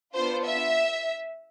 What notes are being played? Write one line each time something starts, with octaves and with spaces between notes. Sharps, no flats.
B3 D4 F4 C5
E5